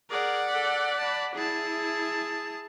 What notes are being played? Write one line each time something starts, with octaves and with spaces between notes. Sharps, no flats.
G#4 A#4 D5 F#5
A4 B6
A5 B5
E4 G#4 A5